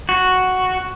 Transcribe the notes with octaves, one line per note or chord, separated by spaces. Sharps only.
F#4